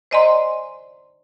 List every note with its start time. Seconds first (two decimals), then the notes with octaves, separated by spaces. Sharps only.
0.11 C5 D5 D#5 G#5 A#5 C6